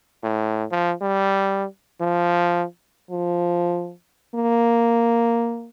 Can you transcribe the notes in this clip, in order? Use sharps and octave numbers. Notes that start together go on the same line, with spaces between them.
A2
F3
G3
F3
F3
A#3